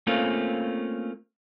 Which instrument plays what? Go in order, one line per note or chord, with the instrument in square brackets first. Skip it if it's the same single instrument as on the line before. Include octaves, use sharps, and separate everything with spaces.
[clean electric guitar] A3 A#3 C4 C#4 F4